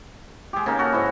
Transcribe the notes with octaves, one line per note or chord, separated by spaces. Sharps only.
G#3 G4
C#3 A#3 D#4
F#4 A4 A#4
G#2 E4